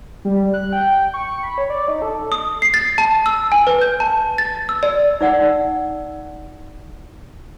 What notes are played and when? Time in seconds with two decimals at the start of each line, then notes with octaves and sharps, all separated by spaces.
0.25 G3
0.54 F#6
0.73 G5
0.91 G5
1.14 C#6
1.43 B5
1.58 C#5
1.70 D5
1.88 D#4
2.02 A4
2.32 D#6
2.62 C7
2.74 A6
2.98 A5
3.26 E6
3.52 G#5
3.67 B4
3.81 G6
4.00 A5
4.38 A6
4.69 E6
4.83 D5
5.21 D#4 D5 F#5 E6